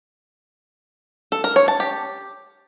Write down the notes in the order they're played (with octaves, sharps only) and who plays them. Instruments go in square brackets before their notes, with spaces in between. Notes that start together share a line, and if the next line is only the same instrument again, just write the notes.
[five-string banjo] A4
A#4
C#5
A5
G4